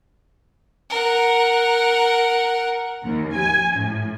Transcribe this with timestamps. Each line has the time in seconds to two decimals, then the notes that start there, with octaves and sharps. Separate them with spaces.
0.90 A#4 F#5
3.05 D#2
3.35 G#5
3.76 A2